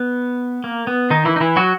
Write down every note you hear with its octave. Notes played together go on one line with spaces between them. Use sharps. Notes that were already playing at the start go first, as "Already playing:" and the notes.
Already playing: B3
A#3
B3
D#3 D#4
E3 E4
D#4
E3 E4
F#3 F#4